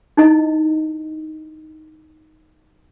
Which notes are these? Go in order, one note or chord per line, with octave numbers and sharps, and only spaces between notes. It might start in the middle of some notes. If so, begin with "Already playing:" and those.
D#4 E4 D#5